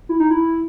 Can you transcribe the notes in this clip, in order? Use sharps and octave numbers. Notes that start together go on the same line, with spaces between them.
E4
D#4
E4